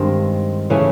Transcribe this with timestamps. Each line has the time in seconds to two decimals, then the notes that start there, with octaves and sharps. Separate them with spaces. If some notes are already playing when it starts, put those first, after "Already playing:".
Already playing: G2 D#3 G#3 C4
0.70 C#3 E3 A3 C#4